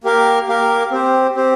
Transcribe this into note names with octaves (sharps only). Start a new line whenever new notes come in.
A#3 G4 A#4 F5
A#3 G4 A#4 F5
C4 G4 C5
C4 G4 C5